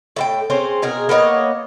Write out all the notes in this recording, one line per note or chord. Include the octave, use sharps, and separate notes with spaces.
A2 F4 G5
C4 C#4 G#4 C5
B2 G#4 A#4
A#3 B3 C#5 D#5